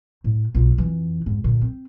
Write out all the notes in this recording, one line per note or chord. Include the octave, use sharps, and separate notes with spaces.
A2
B1 F4
F2 E3
F2 G#2
A#2 D3
C4